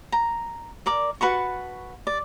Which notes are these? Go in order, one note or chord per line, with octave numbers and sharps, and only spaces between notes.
A#5
A#4 D5 D6
F#4 B4 A5 C#6
D5